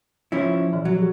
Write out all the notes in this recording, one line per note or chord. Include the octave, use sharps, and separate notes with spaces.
F3 C#4 E4
E5
A#2 E3 F3
F#3
G4 G#4